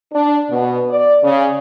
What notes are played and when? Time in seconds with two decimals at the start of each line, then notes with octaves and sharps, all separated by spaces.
0.13 D4
0.50 B2
0.89 D5
1.23 C#3